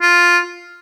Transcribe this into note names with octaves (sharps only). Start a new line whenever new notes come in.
F4